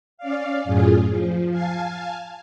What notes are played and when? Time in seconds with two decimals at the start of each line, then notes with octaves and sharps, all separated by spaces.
0.18 C#4 D5 F5
0.64 F#2 A2 F4 G#4
1.08 F3
1.50 F5 G#5 A5